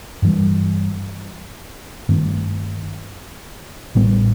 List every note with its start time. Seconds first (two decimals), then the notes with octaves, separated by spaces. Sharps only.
0.22 G2 E3 G3
2.09 G2 D#3 A3 C4
3.95 A1 A2 G3 B3